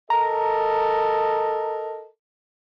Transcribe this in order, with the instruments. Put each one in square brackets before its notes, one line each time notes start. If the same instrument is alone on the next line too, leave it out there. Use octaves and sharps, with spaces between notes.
[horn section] A4 A#4 D#5 [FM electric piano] A#5